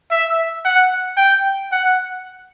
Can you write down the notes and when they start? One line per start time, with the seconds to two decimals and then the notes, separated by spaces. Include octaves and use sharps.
0.11 E5
0.65 F#5
1.17 G5
1.72 F#5